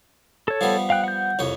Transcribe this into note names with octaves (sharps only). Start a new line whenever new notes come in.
A4 C#5
F3 G3 B3
F5 G5 F#6
F#5 G6
C2 F2 C#5